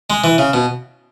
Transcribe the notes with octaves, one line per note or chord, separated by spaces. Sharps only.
G#3
E3
C#3
B2